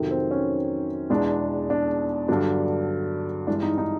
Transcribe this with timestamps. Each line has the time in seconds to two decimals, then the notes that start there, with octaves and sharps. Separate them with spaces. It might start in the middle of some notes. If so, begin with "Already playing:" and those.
Already playing: F2 C3 D#3 F#3
0.11 C4
0.31 C#4
1.10 E2 B2 G#3 D4
1.70 D4
2.28 G2 D3 F#3 D4
3.47 G2 E3 G#3 D4
3.63 D#4
3.78 D#4